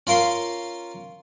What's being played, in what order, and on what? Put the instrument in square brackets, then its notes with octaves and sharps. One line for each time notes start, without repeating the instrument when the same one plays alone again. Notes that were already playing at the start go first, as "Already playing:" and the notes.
[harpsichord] C#4 F4 A#4 F5 C6